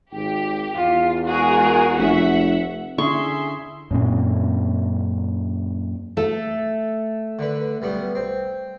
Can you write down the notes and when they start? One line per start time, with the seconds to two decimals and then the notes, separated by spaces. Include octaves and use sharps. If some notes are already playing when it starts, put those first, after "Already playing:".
0.12 G#1 G4
0.75 E2 F4
1.26 G#3 F#4 G#4 A#4
1.98 F1 E5 F#5
2.98 D3 C#4 E4 G#4 E5 C6 C#6
3.91 F#2 A#2 C4
6.17 A3 A4
7.39 D3 B4
7.82 B1 G3 B3
8.15 C4